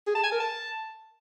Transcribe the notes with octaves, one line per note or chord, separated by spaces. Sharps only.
G#4
A5
G#5
A#4
A5